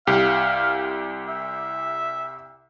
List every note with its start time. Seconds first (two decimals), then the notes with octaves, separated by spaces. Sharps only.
0.07 C2 G4 F5
1.28 E5